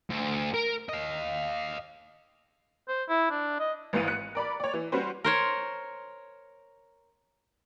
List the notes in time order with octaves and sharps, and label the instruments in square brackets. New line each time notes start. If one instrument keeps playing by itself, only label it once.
[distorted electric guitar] D2
A#4
D#5 F5
[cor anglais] C5
E4
D4
D#5
[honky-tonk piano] G#1 G#2 E3 F5 D#7
F#6 C#7
A#4 D5 B5
C#5 D5
E3
G3 C#4 F#4 B4 C5
[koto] A#4 C5 C#5